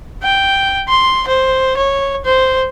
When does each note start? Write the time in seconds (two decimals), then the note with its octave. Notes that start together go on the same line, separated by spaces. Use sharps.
0.23 G5
0.89 C6
1.28 C5
1.77 C#5
2.25 C5